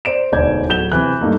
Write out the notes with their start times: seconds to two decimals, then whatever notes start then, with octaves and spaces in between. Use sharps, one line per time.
0.05 C5 D5 D7 E7
0.32 E1 D2 D#4 D5 G6 G#6
0.68 D1 F#4 A4 G6 E7 G7
0.92 C3 E3 F#6
1.21 G2 A3 A#3 D#4